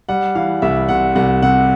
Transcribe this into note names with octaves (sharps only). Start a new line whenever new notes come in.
G3 F#5
E3 F5
C2 E5
C3 F#5
C2 F#5
C3 F#5